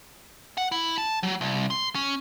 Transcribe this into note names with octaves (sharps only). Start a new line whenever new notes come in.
F#5
E4
A5
F#3
C2
C6
C#4